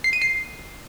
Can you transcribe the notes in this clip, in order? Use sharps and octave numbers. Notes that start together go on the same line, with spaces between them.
C7
D#7
C7